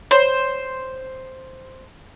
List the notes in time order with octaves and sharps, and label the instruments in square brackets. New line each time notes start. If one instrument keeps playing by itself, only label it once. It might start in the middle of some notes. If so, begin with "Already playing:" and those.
[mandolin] C5 [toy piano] C#5 C6